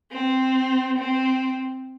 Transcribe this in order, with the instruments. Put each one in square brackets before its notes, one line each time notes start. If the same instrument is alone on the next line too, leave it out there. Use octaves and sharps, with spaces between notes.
[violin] C4
C4